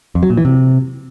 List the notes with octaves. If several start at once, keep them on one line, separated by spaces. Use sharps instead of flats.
F2
F#3
A#2
E3
C3